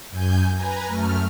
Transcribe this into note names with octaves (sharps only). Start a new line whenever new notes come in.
F#2 G#5 G6
B4 G#5 A#5
F#2 A3 F6